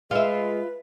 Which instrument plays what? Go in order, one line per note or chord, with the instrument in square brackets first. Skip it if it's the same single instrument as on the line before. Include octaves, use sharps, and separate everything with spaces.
[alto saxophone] G#3 [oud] F4 E5 [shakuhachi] B4